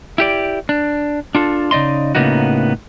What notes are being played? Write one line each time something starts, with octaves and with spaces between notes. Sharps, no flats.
E4 G4 D5
D4
D4 F4 A4
C#3 D#4 D5 D#5 C6
A2 C#3 A#3 B3 D#4 F#4